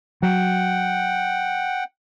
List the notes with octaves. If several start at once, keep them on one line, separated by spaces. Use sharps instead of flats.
F#3 F#5 G5